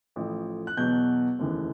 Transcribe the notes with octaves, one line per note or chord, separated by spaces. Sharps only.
A1 A2 F3
F#6
E2 B2 F#3 G6
F1 D#2 C#3 E3